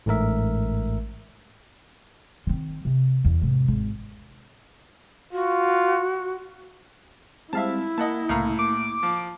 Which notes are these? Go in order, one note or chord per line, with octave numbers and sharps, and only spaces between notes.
A1 G#2 A3 A#4 E5
D#3 C4
C3
E2
G#2 C3
G#1
F4 F#4
G3 G#3 C4 E4 E5 F5 A5
A#3 D#5 F#5 A5
C2 A2 C#3 A#3 F5 A#5
A#3 D6
F3